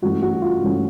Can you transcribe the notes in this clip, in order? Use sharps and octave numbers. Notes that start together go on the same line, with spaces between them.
G2 E3 A3 C#4 F#4
F#4
F4
G2 E3 A3 C#4